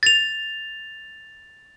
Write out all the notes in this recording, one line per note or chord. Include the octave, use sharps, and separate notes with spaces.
A6 F7